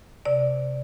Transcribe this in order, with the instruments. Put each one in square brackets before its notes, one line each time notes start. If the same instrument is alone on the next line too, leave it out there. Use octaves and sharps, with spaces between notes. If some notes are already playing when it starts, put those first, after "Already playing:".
[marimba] C3 D5